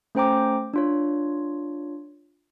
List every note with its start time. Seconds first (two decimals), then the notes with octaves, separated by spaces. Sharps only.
0.15 A3 C#4 C5 G5 A#5 D6
0.74 D4 F4 C#5